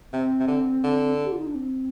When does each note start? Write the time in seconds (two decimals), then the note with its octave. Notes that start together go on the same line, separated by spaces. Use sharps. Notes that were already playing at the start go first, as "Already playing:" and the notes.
0.13 C3 C4
0.40 C3
0.47 D3
0.84 D3
1.25 G4
1.32 F4
1.39 D#4
1.47 D4
1.55 C4